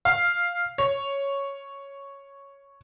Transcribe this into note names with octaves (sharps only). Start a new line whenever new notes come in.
F5
C#5